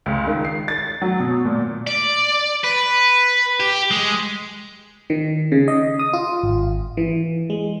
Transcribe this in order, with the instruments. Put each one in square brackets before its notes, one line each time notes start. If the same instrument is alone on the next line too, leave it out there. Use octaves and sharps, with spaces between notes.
[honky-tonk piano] C#2
D#3
C7
A6
F#3
B2
A#2
[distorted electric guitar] D5
B4
G4
G#3
[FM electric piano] D#3
C#3
D#5
D#6
F4
G#1
E3
G#3